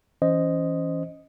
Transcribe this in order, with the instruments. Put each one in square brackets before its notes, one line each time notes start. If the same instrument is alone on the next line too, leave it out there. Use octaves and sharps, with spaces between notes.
[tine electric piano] E3 C#4 C5 D#5